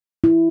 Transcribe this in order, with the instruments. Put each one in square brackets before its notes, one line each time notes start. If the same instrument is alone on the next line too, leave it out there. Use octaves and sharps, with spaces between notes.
[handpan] E4